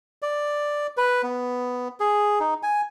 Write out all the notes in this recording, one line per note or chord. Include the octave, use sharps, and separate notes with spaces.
D5
B4
B3
G#4
D#4
G#5